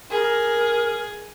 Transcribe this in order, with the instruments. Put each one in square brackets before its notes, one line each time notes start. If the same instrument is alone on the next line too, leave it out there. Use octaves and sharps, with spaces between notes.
[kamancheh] G#4 [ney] A#4